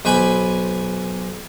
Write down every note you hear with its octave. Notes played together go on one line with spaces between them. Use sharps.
B1 B4 C5 G#5 B5